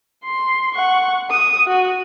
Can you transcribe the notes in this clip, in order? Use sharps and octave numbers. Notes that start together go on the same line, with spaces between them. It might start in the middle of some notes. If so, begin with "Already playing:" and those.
C6
F#5 C#6
D#6
F#4